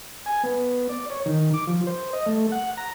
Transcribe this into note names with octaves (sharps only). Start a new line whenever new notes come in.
G#5
B3
D5
C#5
D#3
D6
F3
C5
D#5
A3
F#5
A#5